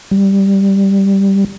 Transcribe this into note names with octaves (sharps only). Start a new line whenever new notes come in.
G3